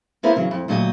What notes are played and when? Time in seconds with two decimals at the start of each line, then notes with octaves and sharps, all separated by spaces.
0.23 A#3 B3 E4 A#4 C5
0.36 C#3 E3 F#3
0.51 F2
0.68 D2 A#2 F#3 G4 D#5